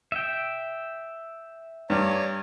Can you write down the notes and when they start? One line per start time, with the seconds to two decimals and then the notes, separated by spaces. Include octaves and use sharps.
0.12 E5 G5
1.90 G2 C#5 D5 A#5